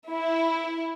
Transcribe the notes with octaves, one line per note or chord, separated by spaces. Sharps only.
E4